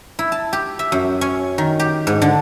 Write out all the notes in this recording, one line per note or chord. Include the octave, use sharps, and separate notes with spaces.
E4
A5
G4
E5
F#2
C#4
D#3
G4
G#2
D3